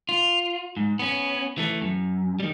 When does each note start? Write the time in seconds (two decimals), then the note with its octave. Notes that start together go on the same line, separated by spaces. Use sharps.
0.09 F4
0.77 G#2
0.99 B3 C#4
1.58 E3 A3
1.82 F#2
2.40 D#3 G3